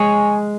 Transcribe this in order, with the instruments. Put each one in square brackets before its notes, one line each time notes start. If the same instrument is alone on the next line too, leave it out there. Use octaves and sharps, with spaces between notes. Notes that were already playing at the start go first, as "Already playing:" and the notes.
Already playing: [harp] G#3 [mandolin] G#4 C#5 G#5